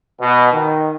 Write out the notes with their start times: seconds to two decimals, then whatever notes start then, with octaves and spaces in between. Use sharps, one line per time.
0.22 B2
0.53 D#3